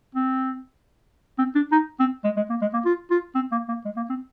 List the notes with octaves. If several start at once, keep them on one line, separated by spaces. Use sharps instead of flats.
C4
C4
D4
D#4
C4
G#3
G#3
A#3
G#3
A#3
F4
F4
C4
A#3
A#3
G#3
A#3
C4